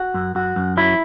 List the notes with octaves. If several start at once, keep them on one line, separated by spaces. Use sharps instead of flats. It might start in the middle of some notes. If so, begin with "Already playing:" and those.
Already playing: F#4
F#2
F#2 F#4
F#2
F#3 E4